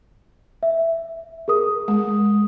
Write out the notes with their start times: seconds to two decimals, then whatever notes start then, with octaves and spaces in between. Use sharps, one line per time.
0.63 E5
1.48 G#4 A#4 D#6
1.88 G#3